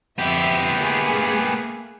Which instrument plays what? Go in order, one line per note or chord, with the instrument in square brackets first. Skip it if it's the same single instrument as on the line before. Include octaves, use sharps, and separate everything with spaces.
[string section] F2 E5 [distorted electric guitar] B3 G4
[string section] A3 A#3 G#4